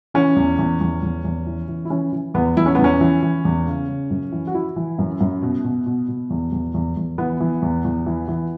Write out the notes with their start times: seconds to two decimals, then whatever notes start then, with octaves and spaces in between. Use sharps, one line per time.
0.14 E3 C#4
0.36 E2
0.59 E2
0.81 E2
1.03 E2
1.24 E2
1.46 E3
1.68 E3
1.85 E4
1.90 E3 C#4
2.12 E3
2.34 E2 B3
2.57 E2 E4
2.66 C#4
2.75 E2 B3
2.84 C#4
3.01 E3
3.23 E3
3.45 E2
3.66 C#3
3.88 C#3
4.11 F#2
4.32 E3
4.47 F#4
4.54 E3 E4
4.76 E3
4.99 F#2
5.20 F#2
5.42 B2
5.64 B2
5.86 B2
6.08 B2
6.30 E2
6.52 E2
6.74 E2
6.97 E2
7.18 E3 B3
7.40 E3
7.62 E2
7.84 E2
8.06 E3
8.28 E3